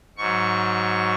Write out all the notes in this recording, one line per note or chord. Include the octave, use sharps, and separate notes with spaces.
G#2 F#3 C#6